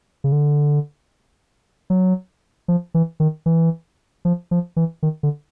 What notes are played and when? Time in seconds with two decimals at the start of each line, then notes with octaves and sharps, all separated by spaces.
0.24 C#3
0.32 D3
1.90 F#3
2.68 F3
2.94 E3
3.20 D#3
3.46 E3
4.25 F3
4.51 F3
4.76 E3
5.03 D#3
5.23 D3